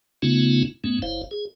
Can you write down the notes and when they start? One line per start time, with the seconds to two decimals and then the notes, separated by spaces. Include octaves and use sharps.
0.22 C#3 A3 B3 C#4 D#4 F4
0.84 G#2 A3 B3 C#4
1.02 F#1 E4 C5 F5
1.31 G#4